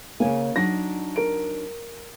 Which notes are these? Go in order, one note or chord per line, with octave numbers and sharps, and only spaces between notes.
C#3 A#3 C#5 G#5
F#3 D4 D#4 A#6
A#4 D7